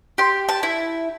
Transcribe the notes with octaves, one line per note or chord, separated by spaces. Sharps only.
G4 C6
A5
E4